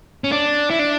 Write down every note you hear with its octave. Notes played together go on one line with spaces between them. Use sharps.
C#4
D4
E4
D4